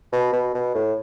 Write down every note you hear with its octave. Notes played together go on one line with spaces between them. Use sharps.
B2
B2
B2
A2